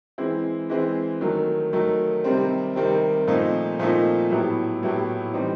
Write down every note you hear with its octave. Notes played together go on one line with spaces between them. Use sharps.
E3 G#3 C4 E4
E3 G#3 C4 E4
D#3 F#3 A3
D#3 F#3 A3
C3 D#3 G3 C4
C3 D#3 G3 C4
A#2 F3 A3 C4 D#4
A#2 F3 A3 C4 D#4
A2 F#3 B3 E4 G4
A2 F#3 B3 E4 G4
E3 G3 C4 D#4